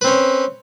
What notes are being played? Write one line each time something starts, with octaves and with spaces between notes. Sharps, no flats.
C4 C#4 B4